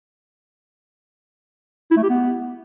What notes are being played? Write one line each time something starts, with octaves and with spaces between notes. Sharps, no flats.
E4
A3
G4
B3